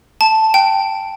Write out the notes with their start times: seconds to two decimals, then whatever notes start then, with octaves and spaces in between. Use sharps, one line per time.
0.21 A5
0.54 G5